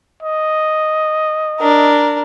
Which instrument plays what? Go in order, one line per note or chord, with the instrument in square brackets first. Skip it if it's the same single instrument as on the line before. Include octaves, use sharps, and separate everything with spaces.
[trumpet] D#5
[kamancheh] D4 A#4